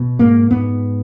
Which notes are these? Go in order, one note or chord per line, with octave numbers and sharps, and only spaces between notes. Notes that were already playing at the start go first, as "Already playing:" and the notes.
Already playing: B2
G#2 A#3
G#2 B3